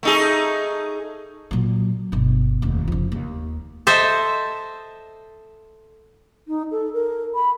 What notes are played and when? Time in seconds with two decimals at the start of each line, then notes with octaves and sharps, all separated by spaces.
0.03 A3 D#4 G#4
1.51 A#2 F#3
2.12 G1 B2
2.62 F1 D#2
2.88 C#3 F3
3.12 D#2
3.87 A4 C5 D#5 E5
6.48 D#4
6.71 A4
6.93 A#4
7.35 B5